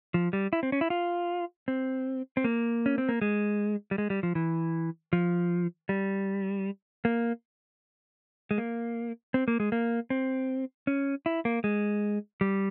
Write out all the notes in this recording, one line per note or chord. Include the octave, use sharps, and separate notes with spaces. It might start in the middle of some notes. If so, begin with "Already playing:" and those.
F3
G3
E4
C4
C#4
E4
F4
C4
C4
A#3
C#4
C4
A#3
G#3
G3
G#3
G3
F3
E3
F3
G3
A#3
G#3
A#3
C4
A#3
G#3
A#3
C4
C#4
E4
A#3
G#3
G3